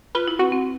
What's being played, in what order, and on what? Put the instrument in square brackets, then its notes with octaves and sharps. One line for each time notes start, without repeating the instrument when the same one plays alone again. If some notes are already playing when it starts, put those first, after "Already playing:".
[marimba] F4 [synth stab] B4
[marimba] E4
[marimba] C4 [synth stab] F#4
[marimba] C4